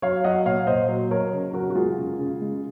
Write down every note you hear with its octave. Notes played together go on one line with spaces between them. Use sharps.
F#3 C#5 F5
F#3 D#5 F#5
A#2 C#5 F5
A#2 C5 D#5
F#3
F#3 A#4 C#5
C#3
F#3 F#4 A#4
F#4
G#3 F4 G#4
C#3
C#3
G#3